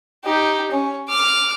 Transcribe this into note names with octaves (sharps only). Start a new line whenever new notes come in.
D#4 G4
C#4
D6 F6